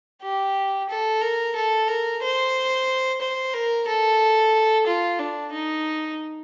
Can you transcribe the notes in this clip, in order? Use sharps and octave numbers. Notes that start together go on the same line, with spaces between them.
G4
A4
A#4
A4
A#4
C5
C5
A#4
A4
F4
D4
D#4